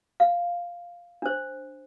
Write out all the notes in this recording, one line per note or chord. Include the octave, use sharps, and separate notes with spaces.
F5
D4 C5